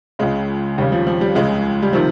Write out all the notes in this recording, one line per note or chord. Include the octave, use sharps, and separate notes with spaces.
C#2 C#3 G#3
D#2 C#3 G3
F3
F3
G3
C#2 C#3 G#3
G3
C3 D#3 F3